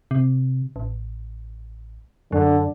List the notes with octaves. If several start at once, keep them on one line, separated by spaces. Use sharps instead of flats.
C3
A1
F#2 D3